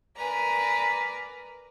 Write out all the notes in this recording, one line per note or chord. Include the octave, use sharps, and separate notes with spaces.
A#4 B4 D5 G#5 A#5